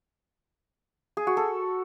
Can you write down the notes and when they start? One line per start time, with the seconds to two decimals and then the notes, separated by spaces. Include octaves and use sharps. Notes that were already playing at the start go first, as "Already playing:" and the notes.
1.17 G#4
1.27 F#4
1.37 A4